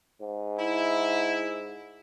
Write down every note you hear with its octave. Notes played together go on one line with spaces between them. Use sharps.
G#2
E4